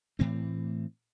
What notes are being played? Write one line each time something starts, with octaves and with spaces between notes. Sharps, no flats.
A2 E3 A3 C4